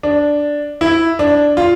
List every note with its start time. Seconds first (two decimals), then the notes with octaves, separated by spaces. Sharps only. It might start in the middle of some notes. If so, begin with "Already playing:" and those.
0.03 D4
0.81 E4
1.19 D4
1.57 F4